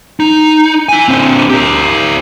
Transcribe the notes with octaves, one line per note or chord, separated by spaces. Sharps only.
D#4
E4 G#5
D3 C4
G4 A#4